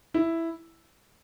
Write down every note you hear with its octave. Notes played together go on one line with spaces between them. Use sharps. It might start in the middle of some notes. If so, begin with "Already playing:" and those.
E4